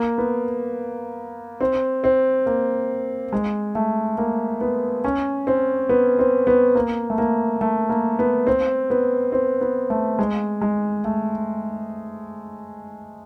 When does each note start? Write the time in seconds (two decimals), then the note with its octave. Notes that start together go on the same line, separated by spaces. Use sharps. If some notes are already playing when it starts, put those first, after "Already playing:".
Already playing: A#3
0.18 B3
1.61 C4
2.04 C4
2.46 A#3
3.33 G#3
3.75 A3
4.18 A#3
4.61 B3
5.04 C#4
5.47 C4
5.89 B3
6.19 C4
6.47 B3
6.75 A#3
7.10 A3
7.18 A#3
7.61 A3
7.89 A#3
8.19 B3
8.47 C4
8.90 B3
9.32 C4
9.61 B3
9.90 A3
10.19 G#3
10.61 G#3
11.05 A3